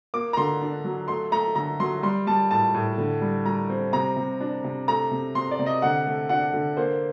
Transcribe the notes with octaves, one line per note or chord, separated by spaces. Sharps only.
A#3 D6
A#5
D3 C6
D4
F#3
A3 C6
A3 A#5
D3 A#5
F#3 C6
G3 C6
G3 A5
A2 A5
A2
D3
G3
G3 A#5
C4
C3 A#5
C3
D4
C3
A3 A#5
C3
C3 C6
D5
C3
D#5
D3 F#5
A3
D4 F#5
D3
A#3 C5